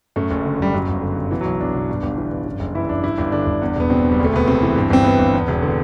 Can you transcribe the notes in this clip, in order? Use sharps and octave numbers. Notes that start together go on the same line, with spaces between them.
F#2 A3
F#1
D3
F#1 G3
F#2 F#3
G1
D3
G1
B2 E3
B1 F#3
B1 D4
B2
G2
G1
E3
G1
F#2
F#1
E3 E4
F#1 D4
G2 E4
G1 D4
D3 D4
G1
E2
E1 B3
B2 C4
E1
G3
D2
A3
E1 B3
C3 C4
E3
G2
G1 C4
E3 B3
G1
E2
E1
D3